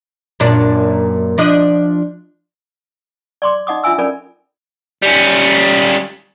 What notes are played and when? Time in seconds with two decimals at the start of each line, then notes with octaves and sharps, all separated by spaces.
0.40 F#2 A#2 D4
1.38 F3 D4 D#5
3.42 D5 C6 D6
3.67 D#4 D#5 F#5 D6 D#6
3.84 D4 F4 E5 G#5 E6
3.98 C#4 A4 A#4 D5 G#5 B5
5.02 G3 C#4